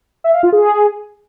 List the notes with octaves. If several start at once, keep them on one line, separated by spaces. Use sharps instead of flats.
E5
F5
F4
G#4